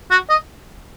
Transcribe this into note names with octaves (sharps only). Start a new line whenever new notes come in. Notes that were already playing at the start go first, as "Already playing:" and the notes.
F#4
D#5